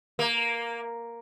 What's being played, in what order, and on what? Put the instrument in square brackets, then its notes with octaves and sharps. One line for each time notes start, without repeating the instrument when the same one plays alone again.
[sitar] A#3